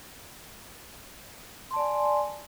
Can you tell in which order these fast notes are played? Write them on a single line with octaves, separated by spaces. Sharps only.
C6 A5 D5 G#5